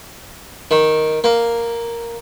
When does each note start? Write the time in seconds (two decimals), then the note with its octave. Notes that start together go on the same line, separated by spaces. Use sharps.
0.71 D#3
1.24 A#3